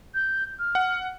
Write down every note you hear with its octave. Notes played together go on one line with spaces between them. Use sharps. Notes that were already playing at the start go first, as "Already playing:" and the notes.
G6
F6
F#5